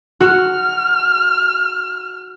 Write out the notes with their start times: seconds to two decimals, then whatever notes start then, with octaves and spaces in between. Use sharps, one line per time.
0.21 F#4 F6